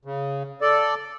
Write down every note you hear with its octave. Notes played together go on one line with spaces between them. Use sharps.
C#3
A4 D5